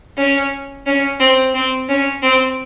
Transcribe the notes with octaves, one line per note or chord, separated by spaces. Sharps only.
C#4
C#4
C4
C4
C#4
C4